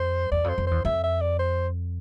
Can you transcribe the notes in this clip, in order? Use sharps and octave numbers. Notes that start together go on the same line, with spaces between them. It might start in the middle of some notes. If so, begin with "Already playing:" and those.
Already playing: F2 C5
E2 D5
F2
C5
F2
E2 C5
F2 E5
E5
D5
C5